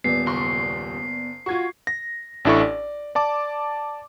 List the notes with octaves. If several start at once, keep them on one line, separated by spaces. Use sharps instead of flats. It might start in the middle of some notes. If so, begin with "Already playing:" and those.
D#1 B3 D5 C7
F#1 C6 C#6
F4 F#4 C#6 G#6
A#6
A1 D4 E4 A4 C#6
D5
D5 A5 D6